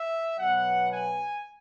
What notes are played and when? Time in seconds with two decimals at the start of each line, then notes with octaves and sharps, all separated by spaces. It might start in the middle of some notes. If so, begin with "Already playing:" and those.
Already playing: E5
0.38 B2 F#3 B3 F#5
0.91 G#5